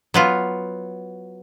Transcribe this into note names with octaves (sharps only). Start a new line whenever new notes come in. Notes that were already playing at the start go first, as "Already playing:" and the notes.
F#3 B3 F4